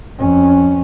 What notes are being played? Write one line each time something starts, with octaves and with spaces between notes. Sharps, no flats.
F2 C#4